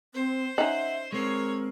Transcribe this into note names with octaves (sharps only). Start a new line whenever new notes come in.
C4 C5
C#4 D#4 E5 F#5
G#3 C4 G#4 A#4 C#5